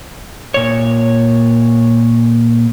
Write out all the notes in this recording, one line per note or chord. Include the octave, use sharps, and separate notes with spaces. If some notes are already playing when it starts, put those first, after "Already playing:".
A#2 C#5